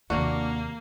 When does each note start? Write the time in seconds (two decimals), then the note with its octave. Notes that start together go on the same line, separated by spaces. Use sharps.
0.10 D#2 C3 A#3 D4 F#4